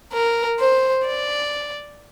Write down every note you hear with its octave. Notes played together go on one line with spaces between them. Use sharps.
A#4
C5
D5